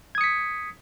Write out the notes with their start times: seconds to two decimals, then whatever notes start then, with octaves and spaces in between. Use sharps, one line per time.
0.15 G#6
0.18 D#6
0.21 C#7
0.24 B6